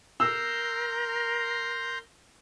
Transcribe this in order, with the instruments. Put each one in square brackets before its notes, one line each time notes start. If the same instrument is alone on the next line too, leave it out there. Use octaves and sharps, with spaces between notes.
[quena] A#4 [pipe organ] A#5 C6 G6 [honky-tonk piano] E6